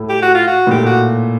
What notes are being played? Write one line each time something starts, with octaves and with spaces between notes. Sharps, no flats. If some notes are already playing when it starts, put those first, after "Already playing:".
Already playing: A2
G4
F#4
F4
F#4
A#2
A2 G4
F#4